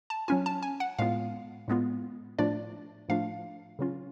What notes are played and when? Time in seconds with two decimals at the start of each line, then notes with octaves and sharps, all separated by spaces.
0.10 A5
0.28 F#3 C#4 F4 G#5
0.46 A5
0.63 G#5
0.80 F#5
0.98 A2 G#3 B3 F4 F5
1.68 A2 G#3 B3 F4
2.39 A2 F3 A3 D4 F4 D5
3.09 A2 F3 A3 D4 F4 F5
3.79 C#3 F#3 C#4 F4